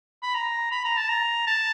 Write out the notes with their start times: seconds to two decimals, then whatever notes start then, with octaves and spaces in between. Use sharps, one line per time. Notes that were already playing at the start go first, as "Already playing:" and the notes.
0.23 B5
0.35 A#5
0.72 B5
0.85 A#5
0.97 A5
1.09 A#5
1.47 A5